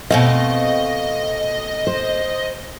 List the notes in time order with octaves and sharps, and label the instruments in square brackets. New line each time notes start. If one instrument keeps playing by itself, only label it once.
[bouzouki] B2 A3 C4 [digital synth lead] D#5 [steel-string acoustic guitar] F5
[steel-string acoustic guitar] C5